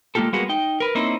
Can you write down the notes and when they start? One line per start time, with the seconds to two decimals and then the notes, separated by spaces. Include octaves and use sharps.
0.15 G#3 A#3 C4 F4 G4 A4
0.33 G3 G#3 A#3 B3 F#4 G#4
0.49 D#4 G5
0.80 A#4 B4
0.95 A#3 C4 C#4 D#4 E4 C5